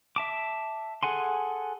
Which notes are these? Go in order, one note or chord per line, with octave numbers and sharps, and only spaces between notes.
E5 A5 D6
G#4 A4 F#5 G#5 C6